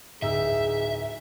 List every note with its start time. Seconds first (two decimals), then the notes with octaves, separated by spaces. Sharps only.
0.22 D1 D#4 G#4 E5 E6